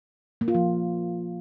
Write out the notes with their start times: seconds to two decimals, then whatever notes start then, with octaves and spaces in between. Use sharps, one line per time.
0.41 A#3
0.48 F4
0.55 F3